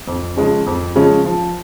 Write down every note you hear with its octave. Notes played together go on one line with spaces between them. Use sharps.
F2
C#3 F3 G#3 C#4
F2
C#3 F3 G#3 C#4
F3